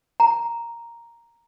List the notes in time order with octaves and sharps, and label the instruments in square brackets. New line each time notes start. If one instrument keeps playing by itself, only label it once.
[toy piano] A#5